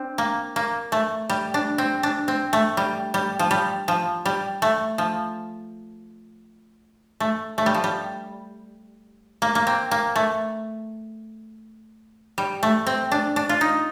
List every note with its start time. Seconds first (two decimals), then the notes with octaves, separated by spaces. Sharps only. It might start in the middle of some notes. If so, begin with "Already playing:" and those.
Already playing: C4 D4
0.18 A#3
0.56 A#3
0.92 A3
1.29 G3
1.54 D4
1.78 C4
2.03 D4
2.28 C4
2.53 A3
2.77 G3
3.14 G3
3.39 F3
3.51 G3
3.88 F3
4.25 G3
4.62 A3
4.98 F3
7.20 A3
7.58 A3
7.66 G3
7.74 F3
7.84 G3
9.42 A#3
9.55 A#3
9.67 C4
9.91 A#3
10.16 A3
12.38 G3
12.63 A3
12.87 C4
13.12 D4
13.36 D4
13.49 F4
13.61 D#4